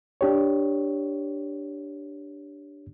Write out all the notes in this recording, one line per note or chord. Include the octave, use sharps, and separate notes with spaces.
D4 G4 C#5